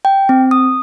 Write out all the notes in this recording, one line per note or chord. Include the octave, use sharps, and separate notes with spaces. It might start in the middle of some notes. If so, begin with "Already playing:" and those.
G5
C4
D#6